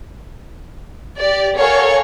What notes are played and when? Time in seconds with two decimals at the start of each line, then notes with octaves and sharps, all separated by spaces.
1.19 G4 D5
1.57 A4 A#4 C#5 F5 F#5 G#5